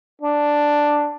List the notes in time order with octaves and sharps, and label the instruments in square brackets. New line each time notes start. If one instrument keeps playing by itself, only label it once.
[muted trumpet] D4